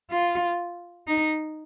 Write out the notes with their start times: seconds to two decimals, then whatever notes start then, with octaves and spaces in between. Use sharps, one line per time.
0.11 F4
1.07 D#4